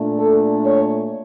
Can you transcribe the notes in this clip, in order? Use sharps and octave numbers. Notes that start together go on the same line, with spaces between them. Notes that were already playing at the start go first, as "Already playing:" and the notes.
Already playing: A#2 A3 D4
A4
C#5